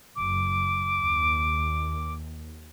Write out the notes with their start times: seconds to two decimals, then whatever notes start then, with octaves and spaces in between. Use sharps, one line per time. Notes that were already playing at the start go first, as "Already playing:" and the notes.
0.16 F#1 D6
0.97 D#2